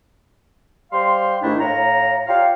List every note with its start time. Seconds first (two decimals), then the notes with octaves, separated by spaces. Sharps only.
0.92 G3 G4 C5 F5 C6
1.42 G#2 D#3 A3 D4 E4
1.60 A2 F4 C#5 A#5
2.27 F4 G4 C#5 F5